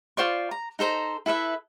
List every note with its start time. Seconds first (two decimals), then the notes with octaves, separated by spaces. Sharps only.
0.17 F4 C5 D5 C#6
0.51 A#5
0.79 D#4 A4 C5 A#5
1.26 E4 A4 B4 E5